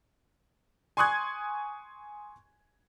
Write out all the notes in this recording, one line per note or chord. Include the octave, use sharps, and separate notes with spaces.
G#5 C6 C#6 D#6 F#6 G#6